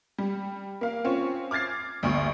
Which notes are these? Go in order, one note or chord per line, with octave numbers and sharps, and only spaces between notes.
G3
A#3 F5
C4 C#4 F4
D6 F6 G#6 A6 C7
G1 D2 C#6